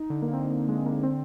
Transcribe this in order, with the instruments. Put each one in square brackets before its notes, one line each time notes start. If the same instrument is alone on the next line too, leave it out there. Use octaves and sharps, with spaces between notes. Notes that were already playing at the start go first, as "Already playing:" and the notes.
Already playing: [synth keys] D#4
[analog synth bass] D3
[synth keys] A#3
C4
A#3
G#3
A#3
C4